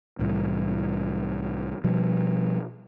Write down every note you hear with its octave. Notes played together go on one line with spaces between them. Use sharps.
C2 A2 E3 G3
B2 F3 G3